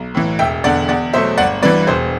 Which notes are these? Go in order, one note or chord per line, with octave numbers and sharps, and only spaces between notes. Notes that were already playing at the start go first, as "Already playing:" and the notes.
Already playing: B1
A2 E3
E1 E5 G5
E2 D3 D5 F#5
E2 D5 F#5
B2 F#3 A3 C5 E5
G1 D5 F#5
G2 E3 B4 D5
E1 C5